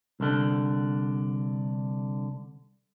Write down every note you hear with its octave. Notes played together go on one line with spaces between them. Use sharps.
C2 D3